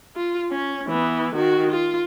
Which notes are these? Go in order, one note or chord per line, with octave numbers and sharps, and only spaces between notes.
F4
C#4
E3 B3
D#3 F#4
F4